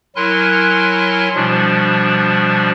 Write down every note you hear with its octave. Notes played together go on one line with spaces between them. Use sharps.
F#3 E4 A#4 G#5 C6 F#6
B2 F3 G3 D4